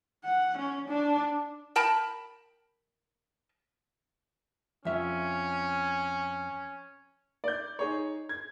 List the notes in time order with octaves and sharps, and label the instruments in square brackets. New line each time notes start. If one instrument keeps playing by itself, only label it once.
[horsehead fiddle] F#5
C#4
D4
[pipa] A#4 G5 A5 B5
[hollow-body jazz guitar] F2 E5 [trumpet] C#4
[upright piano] D5 G6
D#4 G#4 C#5
G#6